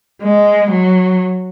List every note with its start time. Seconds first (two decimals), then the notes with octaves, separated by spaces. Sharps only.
0.22 G#3
0.71 F#3